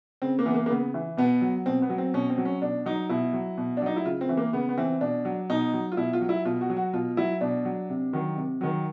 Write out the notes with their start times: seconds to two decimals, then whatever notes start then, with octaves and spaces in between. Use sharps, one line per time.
0.22 C#3 C4
0.39 A#3
0.46 E3 B3
0.54 A#3
0.66 A#3
0.70 C#3 B3
0.94 E3
1.17 B2 B3
1.41 F#3
1.66 B2 C4
1.82 B3
1.90 F#3
1.98 C4
2.14 B2 C#4
2.30 C4
2.38 F#3
2.45 C#4
2.62 B2 D4
2.86 F#3 D#4
3.09 B2 E4
3.33 F#3
3.58 B2
3.77 D4
3.82 F#3 D#4
3.96 E4
4.05 C#3 F4
4.21 C4
4.29 E3
4.37 A#3
4.53 C#3 B3
4.69 B3
4.78 E3 C4
5.01 B2 D4
5.25 F#3
5.50 B2 D#4
5.73 F#3
5.92 F4
5.97 B2 E4
6.13 F4
6.21 F#3
6.29 E4
6.45 B2 F4
6.61 F#4
6.70 F#3
6.77 F#4
6.93 B2 F4
7.17 F#3 E4
7.41 B2 D4
7.65 F#3
7.89 C3
8.13 D#3 F#3
8.36 C3
8.61 D#3 F#3